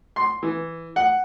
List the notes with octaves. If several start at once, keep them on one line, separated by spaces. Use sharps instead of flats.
C6
E3
F#5